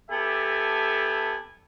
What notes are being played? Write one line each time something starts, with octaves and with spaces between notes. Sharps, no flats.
B3 G4 A4 E5 G#5 A5